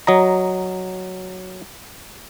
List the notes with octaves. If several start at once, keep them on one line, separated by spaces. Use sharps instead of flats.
F#3 D#5 A#5